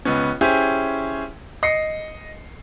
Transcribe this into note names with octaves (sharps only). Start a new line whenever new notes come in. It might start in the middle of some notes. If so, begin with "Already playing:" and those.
C#2 B3 C#4
C#4 E4 G4 G#4 C5
D#5 C7 C#7